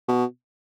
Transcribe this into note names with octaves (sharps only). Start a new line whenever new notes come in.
B2